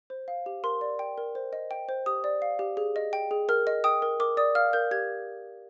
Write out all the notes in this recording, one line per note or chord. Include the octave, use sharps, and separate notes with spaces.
C5
F5
G4
A#4 C6
D5
G5
A#4
C5
D#5
G5
C5
G4 D#6
D5
F5
G4
G#4
D#5
G5
G#4
A#4 F6
D#5
G5 D#6
A#4
A#4 D6
D5 D#6
F5 F6
A#4 G6
G4 G#6